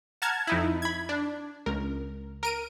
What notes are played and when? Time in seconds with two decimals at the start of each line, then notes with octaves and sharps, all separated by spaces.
0.22 F#5 A5 A#5 F6 G#6
0.47 F2 D#4 E4
0.82 B5 G#6
1.09 D4
1.66 C#2 A#4
2.43 A#4 D7 D#7